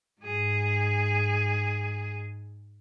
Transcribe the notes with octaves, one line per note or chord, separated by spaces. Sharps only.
G#2 G#4